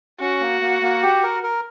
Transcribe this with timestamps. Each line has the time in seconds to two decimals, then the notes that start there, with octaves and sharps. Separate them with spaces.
0.20 C#4 F#4
0.41 A#3
0.62 A#3
0.82 A#3
1.03 G4
1.23 A#4
1.43 A#4